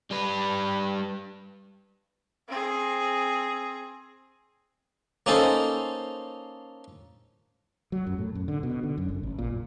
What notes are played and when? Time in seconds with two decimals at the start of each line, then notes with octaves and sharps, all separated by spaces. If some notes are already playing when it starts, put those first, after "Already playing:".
0.11 G3 B4
2.48 C4 G#4
5.26 A#3 C#4 D#4 A4 A#4 C5
7.92 F#3
8.07 F#2
8.18 A2
8.35 F#2
8.48 D3
8.63 B2
8.83 D3
8.98 F#2
9.09 F#1
9.23 A1
9.39 A#2
9.50 F#1